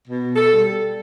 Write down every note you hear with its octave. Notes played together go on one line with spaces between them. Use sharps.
B2
A4
G3